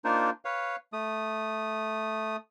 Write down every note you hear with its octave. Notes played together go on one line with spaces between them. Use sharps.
A#3 D4 D#4 F4 A#4 C5
B4 C#5 F5
A3 D#6